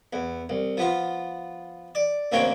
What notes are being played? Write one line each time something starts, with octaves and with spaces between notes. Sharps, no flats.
E2
C2
F3 B3 F4
D5
A1 D2 A#3 C4 C#5 G5